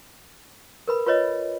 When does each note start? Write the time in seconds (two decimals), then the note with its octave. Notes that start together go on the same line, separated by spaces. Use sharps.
0.88 A#4 B4 B5
1.06 F4 B4 C#5 D#5